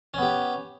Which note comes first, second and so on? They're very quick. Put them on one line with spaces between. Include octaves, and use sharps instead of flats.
C#4 B3 G4